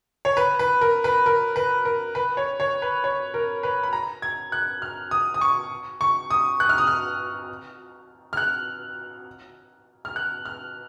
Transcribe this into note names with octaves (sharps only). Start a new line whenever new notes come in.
C#5
B4
B4
A#4
B4
A#4
B4
A#4
B4
C#5
C#5
B4
C#5
A#4
B4
B5
A#5
G#6
F#6
F6
D#6
D#6
C#6
C#6
D#6
F#6
F6
D#6
F6
F6
F#6
F6
F#6
F6